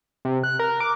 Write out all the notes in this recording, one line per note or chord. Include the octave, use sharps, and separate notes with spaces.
C3
F#6
A#4
D6